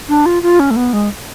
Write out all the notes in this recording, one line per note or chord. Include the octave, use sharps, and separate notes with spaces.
D4
F4
F4
C#4
A3
B3
G#3